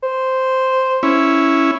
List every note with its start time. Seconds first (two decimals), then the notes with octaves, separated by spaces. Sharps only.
0.03 C5
1.03 C#4 E4